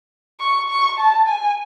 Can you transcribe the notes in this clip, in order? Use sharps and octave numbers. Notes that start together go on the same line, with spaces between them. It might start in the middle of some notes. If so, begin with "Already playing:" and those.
C#6
C#6
A5
G#5